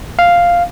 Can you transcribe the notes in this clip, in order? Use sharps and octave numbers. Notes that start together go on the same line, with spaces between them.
F5